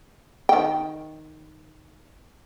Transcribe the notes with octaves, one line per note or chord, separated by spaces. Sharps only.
D#3 G5